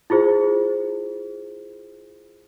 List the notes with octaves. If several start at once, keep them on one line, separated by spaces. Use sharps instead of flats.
E4 F4 G#4 C5